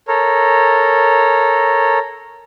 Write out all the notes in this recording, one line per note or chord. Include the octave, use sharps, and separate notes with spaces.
A4 A#4 C#5